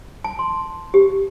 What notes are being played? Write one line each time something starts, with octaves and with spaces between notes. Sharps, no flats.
A5
C6
G4